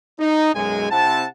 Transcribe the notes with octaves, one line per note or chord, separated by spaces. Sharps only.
D#4
B1 F#2 G#3 G#5
C3 C4 E4 F#5 A5